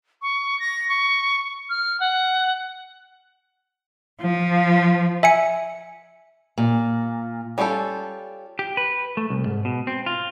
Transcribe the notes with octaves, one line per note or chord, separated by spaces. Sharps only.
C#6
A#6
C#6
F6
F#5
F3
E5 G#5 C#7
A#2
G3 C#4 F4 G4 A4
G4
B4
A3
C2
G#2
B2
C4
F4